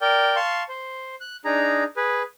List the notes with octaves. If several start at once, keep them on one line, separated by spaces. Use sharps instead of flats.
A#4 D5 G5
F5 A5 C6 C#6
C5
F#6
D4 D#4 G#4 A#5
G#4 B4